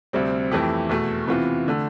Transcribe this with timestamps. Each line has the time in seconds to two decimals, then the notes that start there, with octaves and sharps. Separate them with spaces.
0.13 D2 C3 G3 C4
0.51 F2 E3 A3 E4 G4
0.89 E2 B2 A3
1.27 C3 E3 B3 F4
1.68 D3 A3